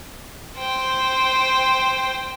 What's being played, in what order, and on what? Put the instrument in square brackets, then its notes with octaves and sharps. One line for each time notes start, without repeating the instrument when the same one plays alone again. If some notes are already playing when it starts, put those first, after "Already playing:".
[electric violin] C5 G5